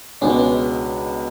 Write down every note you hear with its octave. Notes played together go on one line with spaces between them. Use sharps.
C#2 B2 G#3 C#4 D4
B3
C#4